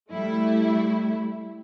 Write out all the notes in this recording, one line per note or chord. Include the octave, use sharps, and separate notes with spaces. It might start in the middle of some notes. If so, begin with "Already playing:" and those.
G3 A3 E4